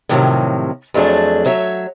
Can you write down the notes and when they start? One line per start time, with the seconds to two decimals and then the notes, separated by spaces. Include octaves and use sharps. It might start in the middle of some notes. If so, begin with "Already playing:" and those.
0.09 A2 C3 D#3 F3 F#3
0.94 F2 F#3 A3 D4 G#4
1.46 F#3 C#5 E5